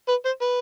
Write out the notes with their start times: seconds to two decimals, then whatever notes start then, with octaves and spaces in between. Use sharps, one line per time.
0.08 B4
0.25 C5
0.41 B4